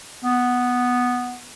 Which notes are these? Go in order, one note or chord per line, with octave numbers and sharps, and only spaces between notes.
B3